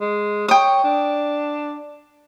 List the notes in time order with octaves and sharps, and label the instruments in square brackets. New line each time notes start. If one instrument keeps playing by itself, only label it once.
[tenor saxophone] G#3
[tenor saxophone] C#5 [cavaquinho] G5 D#6
[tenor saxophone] D4